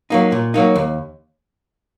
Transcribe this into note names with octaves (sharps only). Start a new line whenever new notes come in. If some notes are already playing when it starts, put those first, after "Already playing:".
F#3 A#3 D#4
A#2
F#3 A#3 D#4
D#2